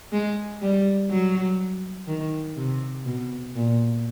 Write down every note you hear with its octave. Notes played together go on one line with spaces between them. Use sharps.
G#3
G3
F#3
D#3
C3
B2
A#2